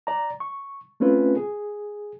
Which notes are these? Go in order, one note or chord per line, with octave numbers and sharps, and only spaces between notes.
D5 A#5
C#6
A3 C4 C#4 F4 B4
G#4